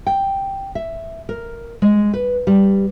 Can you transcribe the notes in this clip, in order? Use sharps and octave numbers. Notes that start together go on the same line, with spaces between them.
G5
E5
A#4
G#3
B4
G3